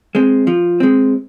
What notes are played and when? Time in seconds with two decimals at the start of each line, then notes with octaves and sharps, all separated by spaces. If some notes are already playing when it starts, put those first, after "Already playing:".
0.15 G#3 C4
0.47 F3
0.80 G#3 C4